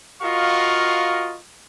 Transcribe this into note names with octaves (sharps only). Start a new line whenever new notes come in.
F4 F#4 A#4 D#5 F5 C#6